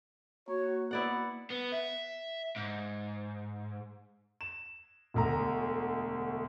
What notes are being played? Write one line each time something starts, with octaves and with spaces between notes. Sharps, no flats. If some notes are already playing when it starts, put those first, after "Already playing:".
A#3 F#4 C#5
B3 E4 D5 F#5
B3
E5
G#2
E7
E1 D2 A#5